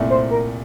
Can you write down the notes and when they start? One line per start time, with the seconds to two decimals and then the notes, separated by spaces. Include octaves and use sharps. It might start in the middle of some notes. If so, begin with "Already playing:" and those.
Already playing: C2 A#2 A3 E4
0.10 C5
0.31 A#4